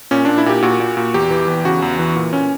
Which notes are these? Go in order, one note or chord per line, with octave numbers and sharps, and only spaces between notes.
A#2 C#4
A#2 D4
E4
A#2 G4
A#2 F#4
A#2
A#2
E2 G4
E3
E2
C#3 F#4
E2
E3
A#2
A#2 C#4